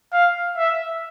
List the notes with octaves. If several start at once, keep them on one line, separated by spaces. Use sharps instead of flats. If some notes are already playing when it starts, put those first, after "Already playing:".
F5
E5